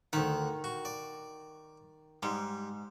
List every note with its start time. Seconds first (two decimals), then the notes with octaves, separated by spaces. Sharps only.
0.13 D2 D#3 F#5
0.64 F#4
0.85 D5
2.23 G#2 G3